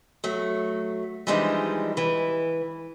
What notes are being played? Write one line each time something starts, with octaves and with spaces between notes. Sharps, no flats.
F#3 A3
E3 F3 G3 G#3 D4 D#4
E3